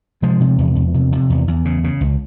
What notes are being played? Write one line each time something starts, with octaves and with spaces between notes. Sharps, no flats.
C3 F3 G#3
C3
E2
E2
C3
C3
E2
E2
C#3
C#3
C#2